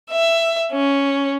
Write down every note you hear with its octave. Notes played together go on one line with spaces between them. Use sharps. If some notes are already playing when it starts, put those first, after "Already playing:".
E5
C#4